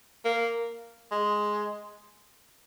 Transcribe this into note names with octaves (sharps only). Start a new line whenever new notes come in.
A#3
G#3